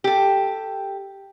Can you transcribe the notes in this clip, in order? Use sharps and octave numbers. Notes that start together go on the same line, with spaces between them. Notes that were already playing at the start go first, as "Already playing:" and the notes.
G4 A4